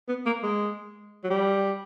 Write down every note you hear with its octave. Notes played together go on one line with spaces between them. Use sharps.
B3
A#3
G#3
F#3
G3